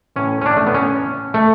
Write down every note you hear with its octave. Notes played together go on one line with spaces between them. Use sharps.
A2 E3 C#4
C#4
D4
A3
B3
C#4
A3